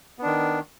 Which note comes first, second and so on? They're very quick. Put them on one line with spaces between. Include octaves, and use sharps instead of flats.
B3 D4 D#3